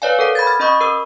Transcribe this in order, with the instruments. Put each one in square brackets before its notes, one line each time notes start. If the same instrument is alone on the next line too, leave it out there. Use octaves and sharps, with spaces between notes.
[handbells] B4 C#5 D5 F5 G#5
A4 A#4 F#5
B5 G#6 A6
F6 A6
C#4 D#5 B5 C#6 D#6
A#4 E6